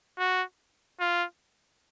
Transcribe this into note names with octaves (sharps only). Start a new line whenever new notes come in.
F#4
F4